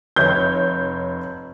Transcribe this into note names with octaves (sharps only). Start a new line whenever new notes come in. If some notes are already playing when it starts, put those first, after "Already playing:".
F1 C#5 G6